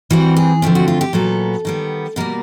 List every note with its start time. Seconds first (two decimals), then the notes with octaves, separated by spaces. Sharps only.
0.11 E3 G3 C4 F#4
0.36 G#4
0.62 D3 F3 A3 C4
0.75 F#4
0.88 F4
1.01 G4
1.13 A#2 F#3 B3 A4
1.65 D#3 G3 B3
2.16 B2 G3 A#3 A#4